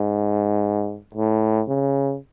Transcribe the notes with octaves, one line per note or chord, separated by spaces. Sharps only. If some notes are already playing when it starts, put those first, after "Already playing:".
Already playing: G#2
A2
C#3